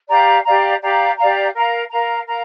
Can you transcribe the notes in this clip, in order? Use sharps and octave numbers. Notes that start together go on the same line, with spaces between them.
G4 D5 F5 A#5
G4 D5 F5 A#5
G4 D5 F5 A#5
G4 D5 F5 A#5
A#4 F5 A#5
A#4 F5 A#5
A#4 F5 A#5